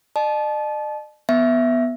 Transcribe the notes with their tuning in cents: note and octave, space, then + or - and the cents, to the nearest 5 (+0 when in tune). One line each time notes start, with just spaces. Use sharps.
D#5 -45 A5 -30
B3 +0 E5 +0